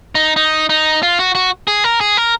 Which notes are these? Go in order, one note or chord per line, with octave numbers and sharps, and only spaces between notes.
D#4
D#4
D#4
F4
F#4
F#4
G#4
A#4
G#4
A#4